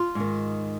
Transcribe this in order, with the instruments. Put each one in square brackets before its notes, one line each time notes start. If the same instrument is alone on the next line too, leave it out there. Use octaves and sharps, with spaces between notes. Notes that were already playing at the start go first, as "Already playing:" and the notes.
Already playing: [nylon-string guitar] F4
G#2 D#3